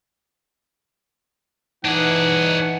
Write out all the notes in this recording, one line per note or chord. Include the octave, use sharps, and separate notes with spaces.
E3 D4 D#4 G#4 F#5